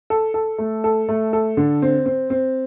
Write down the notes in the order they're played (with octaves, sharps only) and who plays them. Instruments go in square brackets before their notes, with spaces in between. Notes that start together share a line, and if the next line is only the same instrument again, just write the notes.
[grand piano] A4
A4
A3
A4
A3
A4
D3
C4
C4
C4